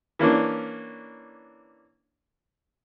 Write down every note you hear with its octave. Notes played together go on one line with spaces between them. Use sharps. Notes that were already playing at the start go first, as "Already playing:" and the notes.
E3 A#3 C#4 D4